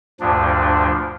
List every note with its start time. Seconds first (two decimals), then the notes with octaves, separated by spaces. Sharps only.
0.20 D2 G2 A#2 F3 D4